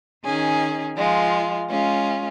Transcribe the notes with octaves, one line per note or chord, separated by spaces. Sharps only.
D#3 C#4 G#4
F3 G#3 F4
G#3 C#4 F4